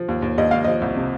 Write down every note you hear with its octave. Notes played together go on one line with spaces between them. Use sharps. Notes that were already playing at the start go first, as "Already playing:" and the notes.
Already playing: F3
D#2
D#2
D#2 D#5
D#2 F5
F3 D#5
C2
C3